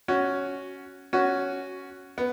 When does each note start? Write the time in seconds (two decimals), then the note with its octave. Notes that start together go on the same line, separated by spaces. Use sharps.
0.08 C#4 F#4
1.13 C#4 F#4
2.18 B3